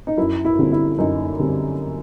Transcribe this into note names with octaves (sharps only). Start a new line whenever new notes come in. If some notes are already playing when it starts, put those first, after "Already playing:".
D#4
F#2 E4
E4
D3 G3 C4
E4
F#2 D#4
D3 G3 C4